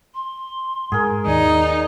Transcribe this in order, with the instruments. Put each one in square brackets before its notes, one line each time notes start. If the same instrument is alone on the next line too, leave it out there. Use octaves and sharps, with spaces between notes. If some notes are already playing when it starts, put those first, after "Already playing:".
[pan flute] C6
[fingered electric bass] G#2 [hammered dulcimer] G#4 A#4
[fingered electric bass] D#2 [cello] D#4 [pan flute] D5